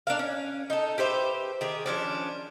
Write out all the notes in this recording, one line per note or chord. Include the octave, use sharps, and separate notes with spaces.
D4 A#4 F5
C#4
D#4 A4
G4 B4 C5 E5
D#3 G4 G#4
F3 C#4 D4